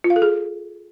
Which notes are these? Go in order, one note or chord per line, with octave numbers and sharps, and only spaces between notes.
F4
F5
A4
G#4